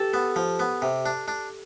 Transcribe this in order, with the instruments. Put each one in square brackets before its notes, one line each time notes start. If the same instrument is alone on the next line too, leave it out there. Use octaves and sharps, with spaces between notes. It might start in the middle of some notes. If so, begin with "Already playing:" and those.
Already playing: [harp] G4 A4
[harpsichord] B3
F3
B3
C3
D4
D4